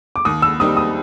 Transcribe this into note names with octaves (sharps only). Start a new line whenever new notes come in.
D6
D#2 D#6
E6
D#3 G3 C4 D#4 D#6
D#6